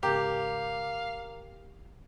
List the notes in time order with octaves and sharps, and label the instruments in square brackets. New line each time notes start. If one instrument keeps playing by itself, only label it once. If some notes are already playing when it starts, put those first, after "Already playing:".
[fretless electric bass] G#2 C#3 [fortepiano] G4 [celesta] A#4 A#5 D6 [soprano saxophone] F5